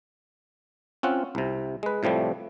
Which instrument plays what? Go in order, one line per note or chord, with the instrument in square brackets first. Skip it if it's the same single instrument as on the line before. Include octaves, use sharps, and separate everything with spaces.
[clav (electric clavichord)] C4 C#4 F4 F#5
C2 C3
G#3 B4
A2 C3 F3 G3 A3